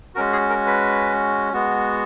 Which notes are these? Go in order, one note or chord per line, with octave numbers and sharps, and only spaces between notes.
G#3 C#4 F#4 A#4
G#4
A#4
B4
G#3 B3 F#4